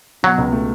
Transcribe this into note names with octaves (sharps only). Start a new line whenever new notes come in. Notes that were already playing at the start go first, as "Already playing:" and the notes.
B2 F#3
C#2
A3